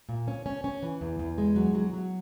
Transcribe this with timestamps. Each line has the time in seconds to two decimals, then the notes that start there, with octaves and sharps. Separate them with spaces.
0.09 A#2
0.28 C#4
0.46 C#4
0.64 C#4
0.83 E3
1.01 E2
1.19 E2
1.38 G#3
1.56 F#3
1.75 F#3
1.93 F#3